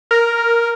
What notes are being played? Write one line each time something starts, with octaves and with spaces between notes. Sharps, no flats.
A#4